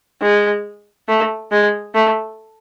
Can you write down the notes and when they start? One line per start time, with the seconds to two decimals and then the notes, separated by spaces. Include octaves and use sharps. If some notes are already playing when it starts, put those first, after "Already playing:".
0.22 G#3
1.08 A3
1.52 G#3
1.95 A3